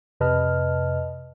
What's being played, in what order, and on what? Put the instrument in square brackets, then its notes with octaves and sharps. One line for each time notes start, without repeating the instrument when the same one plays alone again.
[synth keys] F2 C3 B4 D#5 A5 F6